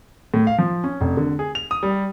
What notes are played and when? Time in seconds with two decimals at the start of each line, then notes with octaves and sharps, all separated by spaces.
0.34 A2
0.47 F5
0.58 F3
0.84 C#4
1.01 F1
1.17 D3
1.39 G#4
1.55 F7
1.71 D#6
1.83 G3